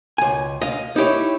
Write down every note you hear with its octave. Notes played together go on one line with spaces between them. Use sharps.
C#2 G#5
D#5 F5
D#4 E4 G4 C#5